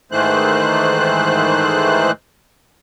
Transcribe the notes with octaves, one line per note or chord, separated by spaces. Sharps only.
G#2 D#3 E3 A3 C5 F#6